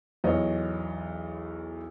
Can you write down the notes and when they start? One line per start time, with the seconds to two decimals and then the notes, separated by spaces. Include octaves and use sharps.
0.24 B1 E2 C#5 D#5